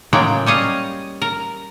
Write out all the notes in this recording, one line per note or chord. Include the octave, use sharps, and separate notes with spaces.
A2 C#3 F#3 G#3 A#3 G5
G3 C#4 D#5 F5
A#4